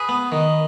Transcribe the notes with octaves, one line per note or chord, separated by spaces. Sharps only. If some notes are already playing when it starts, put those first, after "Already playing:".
Already playing: G#4 B4
B3
D#3